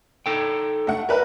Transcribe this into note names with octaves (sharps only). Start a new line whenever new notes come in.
D#4 A4 G5
A3 F#5
A#4 B4 E5